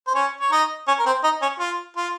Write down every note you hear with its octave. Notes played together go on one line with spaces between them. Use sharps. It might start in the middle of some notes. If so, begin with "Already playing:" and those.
C5
C#4 C#5
C#5
D#4 D#5
C#4 C#5
A#4
C4 C5
D#4 D#5
C#4 C#5
F4
F4